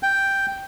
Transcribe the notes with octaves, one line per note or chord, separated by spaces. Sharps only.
G5